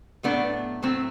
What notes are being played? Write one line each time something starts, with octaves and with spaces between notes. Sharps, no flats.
A2 F#3 A3 B3 D4
A2 F#3 A3 C4